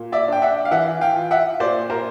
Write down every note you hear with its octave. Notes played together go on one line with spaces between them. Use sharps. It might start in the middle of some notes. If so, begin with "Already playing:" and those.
Already playing: A#2
D5 E5
D4 G5
E5 F#5
F5
E3 E5 F#5
F5 G5
F4
E5 F#5
A#2 C5 D5
A#4 C5